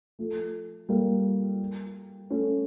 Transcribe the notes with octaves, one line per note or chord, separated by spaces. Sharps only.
F3 A3
G3 A#3
A3 C#4